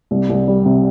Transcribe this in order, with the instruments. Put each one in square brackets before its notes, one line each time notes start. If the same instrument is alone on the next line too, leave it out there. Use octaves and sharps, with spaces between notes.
[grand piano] C2
C2
G3
C3